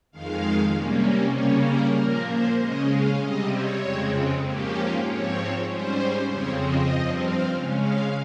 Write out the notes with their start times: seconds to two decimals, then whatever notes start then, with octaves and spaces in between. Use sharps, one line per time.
0.12 F2 D#3 G#3 F5
0.72 C3 G3 A#3 C#4
1.34 C#3 G3 A#3 C#4 C#5
1.65 A#4
1.96 A#2 F3 A#3 A#4
2.27 C5
2.57 C#3 G#3 C#4 D#5
2.89 F5
3.19 C3 G3 C4 D#5
3.50 C#5
3.81 F2 C#3 G#3 C4
4.42 G#2 F3 A#3 C#4 G4
5.03 G#2 F3 C4 C#5
5.65 G#2 G3 C#4 C5
6.27 F2 C#3 F3 C4 C#5
6.57 D#5
6.88 G2 F3 C4
7.19 F5
7.50 C#3 G#3 C#4
7.81 F5